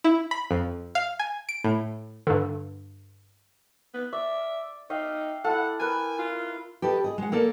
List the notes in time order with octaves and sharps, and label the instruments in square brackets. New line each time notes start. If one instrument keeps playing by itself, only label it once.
[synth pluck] E4
B5
F2
F5
G#5
D7
A2
[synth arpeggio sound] G2 D3
[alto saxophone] B3
[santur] D5 [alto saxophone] E5
[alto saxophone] D#4 [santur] E5 F5 G5
[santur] E4 A4 [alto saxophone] F#5
[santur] A#4 B4 [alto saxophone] G#5
[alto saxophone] F4
[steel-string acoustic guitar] G4 A4 B4 D#5
G#4 D#5
G#3 F#5
A#3 A4 A#4 D5